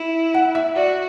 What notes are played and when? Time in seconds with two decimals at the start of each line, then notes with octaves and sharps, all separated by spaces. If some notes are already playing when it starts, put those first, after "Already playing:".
Already playing: E4
0.34 F#5
0.55 E5
0.76 F#4 D5